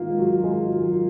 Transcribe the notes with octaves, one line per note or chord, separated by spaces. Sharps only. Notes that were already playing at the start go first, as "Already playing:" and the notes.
Already playing: G#1 G#2 D#3 A#3 F4
G#3
F#3
G#3
F#3
F#3